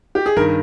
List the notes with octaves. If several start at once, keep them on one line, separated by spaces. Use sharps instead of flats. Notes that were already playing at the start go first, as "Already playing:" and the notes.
G4
G#4
G2 D#3 A#4